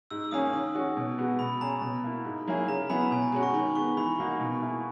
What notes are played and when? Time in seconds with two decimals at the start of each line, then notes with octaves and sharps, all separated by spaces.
0.11 G#2 E6
0.24 E6
0.31 D#3 A#3 C#4 G#4 D#6
0.53 D#3 D#6
0.75 G#3 C#4 F#4
0.97 B2
1.18 G#3 B3 F#4
1.39 B2 B5
1.61 G#3 C#4 G#4 A#5
1.82 B2
2.04 A#3 E4
2.25 G#2
2.47 F#3 A#3 E4 G#4
2.68 C#3 A#5
2.90 F#3 B3 E4 G#4 B5
3.01 A#5
3.11 B2 G#5
3.22 A#5
3.32 G#3 C#4 F#4
3.43 C#6
3.54 D#3 B5
3.75 G#3 B3 C#6
3.97 E3 B5
4.18 A#3 D#4 F#4
4.40 B2
4.61 A#3 E4 G#4